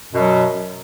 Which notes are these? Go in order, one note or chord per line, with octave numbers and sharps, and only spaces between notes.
F#2 B2 F#3